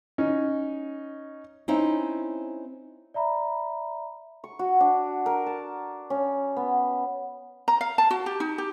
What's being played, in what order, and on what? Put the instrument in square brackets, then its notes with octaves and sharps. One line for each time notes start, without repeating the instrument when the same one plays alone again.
[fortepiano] C#4 D#4
[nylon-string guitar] C4 C#4 D#4 E4
[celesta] D5 E5 A#5 B5
[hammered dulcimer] C#6
F#4
D4
A#4
A5
C#4
B3
[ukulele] A#5
F5
A5
F#4
G4
D#4
G4